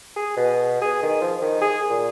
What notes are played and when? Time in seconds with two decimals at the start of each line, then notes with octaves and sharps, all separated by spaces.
0.16 G#4
0.37 B2
0.82 G#4
1.03 D#3
1.21 F3
1.42 D#3
1.61 G#4
1.90 A#2